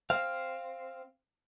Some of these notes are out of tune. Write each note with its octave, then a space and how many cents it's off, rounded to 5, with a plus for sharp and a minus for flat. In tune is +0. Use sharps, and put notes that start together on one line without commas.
C4 +5 F5 +0